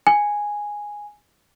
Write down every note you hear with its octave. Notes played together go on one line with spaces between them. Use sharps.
G#5